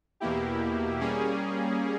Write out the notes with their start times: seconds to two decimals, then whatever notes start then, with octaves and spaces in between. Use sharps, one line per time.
0.20 E2 B2 A#3 E4 G4
1.00 G3 A#3 C#4 G#4